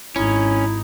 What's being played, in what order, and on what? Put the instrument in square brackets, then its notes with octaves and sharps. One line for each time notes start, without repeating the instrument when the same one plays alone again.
[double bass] G#1 D#4 [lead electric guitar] C#4 [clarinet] E4